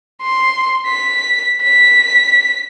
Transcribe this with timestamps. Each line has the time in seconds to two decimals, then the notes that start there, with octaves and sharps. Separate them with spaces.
0.22 C6
0.87 B6
1.63 B6